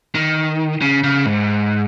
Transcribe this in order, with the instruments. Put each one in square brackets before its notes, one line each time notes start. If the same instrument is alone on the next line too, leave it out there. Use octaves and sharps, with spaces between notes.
[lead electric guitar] D#3
C#3
C#3
G#2